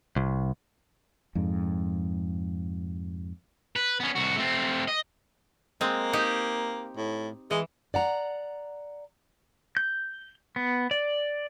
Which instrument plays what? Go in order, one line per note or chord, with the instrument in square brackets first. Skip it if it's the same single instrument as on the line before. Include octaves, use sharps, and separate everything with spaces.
[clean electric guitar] C2
[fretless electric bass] F2 G#2
[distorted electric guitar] B4
B3 C#4
C2 F#4
A3 C4
D#5
[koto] G#3 C4 [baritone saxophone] A#3
[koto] D#4 G4
[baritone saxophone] A2
[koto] E3 [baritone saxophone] G#3
[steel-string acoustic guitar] D5 F#5 A#5
[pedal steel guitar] G6
B3
D5